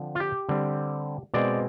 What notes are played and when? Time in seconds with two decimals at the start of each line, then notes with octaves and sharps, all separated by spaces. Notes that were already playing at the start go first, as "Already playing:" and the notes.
Already playing: D3 F3 C4
0.15 F4
0.20 G4
0.49 D3 G3 C4
1.34 B2 G#3 C4 D5